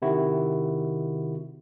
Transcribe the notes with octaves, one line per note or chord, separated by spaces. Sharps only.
C3 D#3 E4 F#4